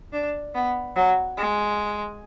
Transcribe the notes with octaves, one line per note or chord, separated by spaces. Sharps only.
D4
B3
F#3
G#3